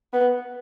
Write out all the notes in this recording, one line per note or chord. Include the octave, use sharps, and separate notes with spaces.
B3